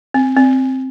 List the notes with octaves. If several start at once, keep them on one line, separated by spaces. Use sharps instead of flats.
C4
C4